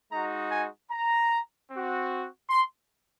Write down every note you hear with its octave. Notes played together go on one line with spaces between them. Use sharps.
G#3 D#4 F#4 A#5
G#5
A#5
C4 F#4
C6